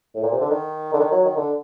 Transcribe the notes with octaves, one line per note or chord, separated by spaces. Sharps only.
A2
A#2
C3
D3
D#3
D3
D#3
F#3
D#3
D3